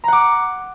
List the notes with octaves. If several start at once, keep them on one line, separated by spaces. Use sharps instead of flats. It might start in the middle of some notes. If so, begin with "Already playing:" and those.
F#5 A#5 D6